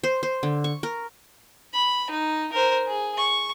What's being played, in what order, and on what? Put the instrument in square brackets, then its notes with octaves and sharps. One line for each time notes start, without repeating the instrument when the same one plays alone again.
[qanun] C5
C5
D3
C#6
A#4
[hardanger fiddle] B5
D#4
A#4 C5
G#4
C#6